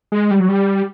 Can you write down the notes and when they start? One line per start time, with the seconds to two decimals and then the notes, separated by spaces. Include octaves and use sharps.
0.12 G#3
0.31 G3
0.40 F#3
0.49 G3